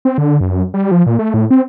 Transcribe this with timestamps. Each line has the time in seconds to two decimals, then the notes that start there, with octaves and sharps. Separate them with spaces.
0.05 C4
0.18 D3
0.41 F#2
0.74 G3
0.91 F3
1.07 A#2
1.19 A3
1.34 A2
1.51 C4